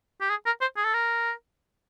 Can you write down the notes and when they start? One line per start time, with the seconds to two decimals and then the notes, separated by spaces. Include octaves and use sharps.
0.21 G4
0.30 G#4
0.46 A#4
0.61 C5
0.77 G#4
0.84 A4
0.94 A#4